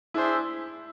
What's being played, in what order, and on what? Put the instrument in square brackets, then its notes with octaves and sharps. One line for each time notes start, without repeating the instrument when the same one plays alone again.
[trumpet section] D4 G#4 C5 E5 [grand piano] E4